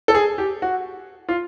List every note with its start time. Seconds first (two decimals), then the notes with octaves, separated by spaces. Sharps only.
0.08 A4
0.15 G#4
0.38 G4
0.62 F#4
1.29 F4